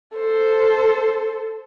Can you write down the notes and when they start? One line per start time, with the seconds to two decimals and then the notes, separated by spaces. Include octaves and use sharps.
0.16 A4 C5